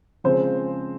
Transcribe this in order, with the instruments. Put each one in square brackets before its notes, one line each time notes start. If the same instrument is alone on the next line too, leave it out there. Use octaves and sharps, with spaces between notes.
[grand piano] C#3 F3 G#3 C4 [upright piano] C5